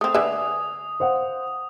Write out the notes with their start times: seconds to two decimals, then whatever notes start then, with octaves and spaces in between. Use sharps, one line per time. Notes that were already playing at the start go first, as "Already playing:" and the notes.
0.01 A3 C4 D#6
0.15 D3 B4 E5 G#5
1.00 C5 F5 F#5